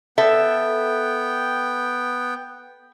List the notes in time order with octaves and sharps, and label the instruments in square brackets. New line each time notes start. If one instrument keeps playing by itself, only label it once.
[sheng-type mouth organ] B3 G5 [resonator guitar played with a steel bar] A4 E5